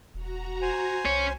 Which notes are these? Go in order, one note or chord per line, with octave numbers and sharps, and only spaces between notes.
E1 F#4 A#5
C5 G#5
C2 C#4 C#5